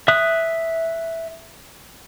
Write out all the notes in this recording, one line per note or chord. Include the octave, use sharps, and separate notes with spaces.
E5 D#6 F#6